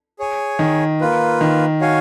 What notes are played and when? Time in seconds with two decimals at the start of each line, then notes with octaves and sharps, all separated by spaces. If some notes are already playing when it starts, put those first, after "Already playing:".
0.19 G#4 C#5 G#5
0.59 D#3
1.00 A#3 F4 B4
1.41 D#3
1.81 F#4 C#5 F5 G#5